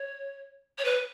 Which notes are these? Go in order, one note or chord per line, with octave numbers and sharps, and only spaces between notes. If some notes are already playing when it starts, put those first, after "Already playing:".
Already playing: C#5
C#5
B4